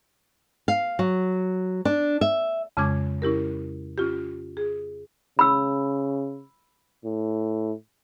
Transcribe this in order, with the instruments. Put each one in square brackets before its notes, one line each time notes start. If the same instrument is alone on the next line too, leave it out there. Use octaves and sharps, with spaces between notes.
[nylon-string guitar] F5
F#3
D4
E5
[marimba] F2 C#3 G#3 C#4 D6 G#6
C#4 E4 G4 A#4
C#4 F4 G4
G#4
[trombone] C#3 [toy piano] B5 E6
[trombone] A2